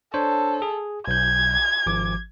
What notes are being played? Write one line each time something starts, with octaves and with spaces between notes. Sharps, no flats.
D4 A4 C5 C#5
G#4
B1 G6 G#6
G#1 F3 D6